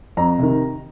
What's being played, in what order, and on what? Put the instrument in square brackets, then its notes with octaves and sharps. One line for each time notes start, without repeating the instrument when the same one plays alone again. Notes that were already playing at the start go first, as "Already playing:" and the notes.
[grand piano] F2 A#5
C3 D#3